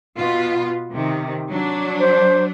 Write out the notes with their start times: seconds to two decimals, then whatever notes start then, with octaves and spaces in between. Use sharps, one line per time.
0.17 B2 B3 F4
0.91 C3 D#3
1.50 F#3 D4
2.00 C5